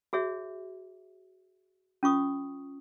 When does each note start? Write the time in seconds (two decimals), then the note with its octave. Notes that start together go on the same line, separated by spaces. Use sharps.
0.13 F#4 G#4 C#5 E5
2.03 C#4 F4 C#6 D#6